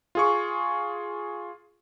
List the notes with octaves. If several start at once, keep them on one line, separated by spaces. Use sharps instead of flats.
F4 G#4 C#6